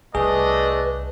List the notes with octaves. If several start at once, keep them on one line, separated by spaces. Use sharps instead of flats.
C2 A3 D4 G#4 B4 D#5